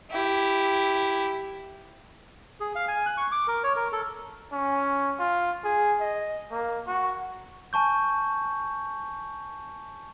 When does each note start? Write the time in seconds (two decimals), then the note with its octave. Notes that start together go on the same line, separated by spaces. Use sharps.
0.11 E4 G4
2.60 G#4
2.75 F5
2.88 G#5
3.06 F#6
3.17 C#6
3.32 D6
3.48 A#4
3.64 C#5
3.76 A#4
3.92 A4
4.53 C#4
5.20 F4
5.64 G#4
6.00 D#5
6.51 A#3
6.87 F#4
7.73 G#5 A5 C#6 G6